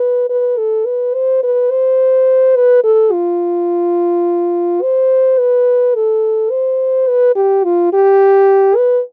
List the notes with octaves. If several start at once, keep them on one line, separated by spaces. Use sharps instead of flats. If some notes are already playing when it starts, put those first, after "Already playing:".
Already playing: B4
B4
A4
B4
C5
B4
C5
B4
A4
F4
C5
B4
A4
C5
B4
G4
F4
G4
B4